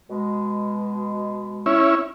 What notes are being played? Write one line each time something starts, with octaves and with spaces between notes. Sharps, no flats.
B2 G#3
C#4 E4